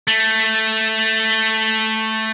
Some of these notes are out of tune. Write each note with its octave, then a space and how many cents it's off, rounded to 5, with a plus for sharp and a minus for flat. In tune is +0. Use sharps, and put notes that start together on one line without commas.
A3 +0